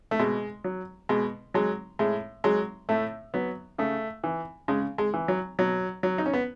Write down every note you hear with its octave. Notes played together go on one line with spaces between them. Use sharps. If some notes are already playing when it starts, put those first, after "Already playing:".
A3
B2 G#3
F#3
B2 G#3
F#3 G#3
A2 G#3
F#3 G#3
A2 A3
F#3 B3
C#3 A3
E3
C#3 G#3
G#3
E3
F#3
B2 F#3
F#3
D#4
C#4
B3